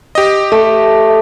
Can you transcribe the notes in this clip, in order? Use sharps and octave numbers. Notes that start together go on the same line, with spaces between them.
G4 D#5
A3